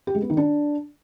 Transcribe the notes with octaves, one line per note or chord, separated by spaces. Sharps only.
G4
G#3
B3
D#3
D4